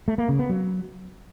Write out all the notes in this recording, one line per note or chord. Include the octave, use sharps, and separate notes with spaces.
A3
A#3
C#3
B3
F#3